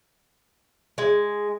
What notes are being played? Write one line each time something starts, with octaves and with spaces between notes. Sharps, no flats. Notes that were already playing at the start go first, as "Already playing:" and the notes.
G#3